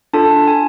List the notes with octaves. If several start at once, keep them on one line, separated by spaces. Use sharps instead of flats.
D4 F4 A4 A5
G#5